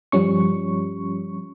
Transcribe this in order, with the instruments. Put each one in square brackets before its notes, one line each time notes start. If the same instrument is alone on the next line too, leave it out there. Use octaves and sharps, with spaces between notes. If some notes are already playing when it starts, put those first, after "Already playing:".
[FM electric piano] G2 F3 G3 C#4 C#6